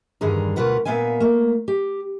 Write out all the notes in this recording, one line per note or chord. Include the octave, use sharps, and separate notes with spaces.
E2 G2 D3 D#3 G#4 A#5
D2 B2 F4 A#4 B4 F#5
A#2 G#3 B3 E5 F5 G#5
A3 A#3
G4